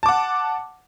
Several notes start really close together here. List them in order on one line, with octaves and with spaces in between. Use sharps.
A5 D6 F#5